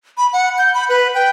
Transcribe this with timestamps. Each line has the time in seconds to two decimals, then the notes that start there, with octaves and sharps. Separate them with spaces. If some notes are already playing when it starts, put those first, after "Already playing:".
0.18 B5
0.33 F#5
0.58 G6
0.74 B5
0.89 B4
1.15 G5